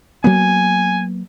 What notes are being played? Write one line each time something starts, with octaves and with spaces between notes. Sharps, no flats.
F#3 A#3 B3 G#5